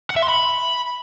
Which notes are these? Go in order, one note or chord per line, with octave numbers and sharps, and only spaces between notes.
F#5
E5
C6
B5